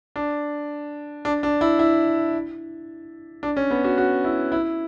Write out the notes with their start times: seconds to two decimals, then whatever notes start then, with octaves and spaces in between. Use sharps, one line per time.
0.16 D4
1.25 D4
1.43 D4
1.61 E4
1.79 E4
3.43 D4
3.57 C#4
3.71 B3
3.84 F#4
3.98 F#4
4.24 E4
4.52 E4